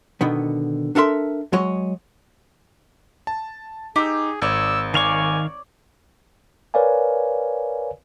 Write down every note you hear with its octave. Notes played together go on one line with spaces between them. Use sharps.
B2 D3 D#3 B3
D4 A4 A#4 E5 C6
F#3 G#3 C#5 D#5
A5
D#4 G4 G#4 E6
G#1 C#5 D5 E6
D#3 C#5 D5 F5 G#5 C#6
A#4 B4 C#5 D5 F5 G#5